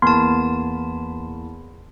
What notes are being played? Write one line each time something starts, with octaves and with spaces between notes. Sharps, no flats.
E2 A#3 B3 A5 B5 C6